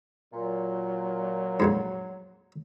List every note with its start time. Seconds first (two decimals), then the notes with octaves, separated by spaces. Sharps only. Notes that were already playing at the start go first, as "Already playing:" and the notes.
0.33 A#2 F#3
1.60 A#1 F2 G#2